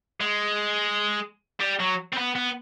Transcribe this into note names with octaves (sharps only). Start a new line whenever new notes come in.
G#3
G3
F#3
C4
B3
B3